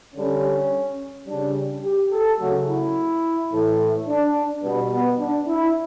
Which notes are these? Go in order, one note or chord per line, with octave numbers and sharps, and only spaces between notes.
D3 G3 C#4
C#3 G3 D4
G4
A4
C#3 F#3 A3 F#4
E4
A2 E3 A3
D4
B2 G3 B3
B3
D4
E4